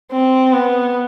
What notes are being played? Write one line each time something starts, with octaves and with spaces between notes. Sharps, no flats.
C4
B3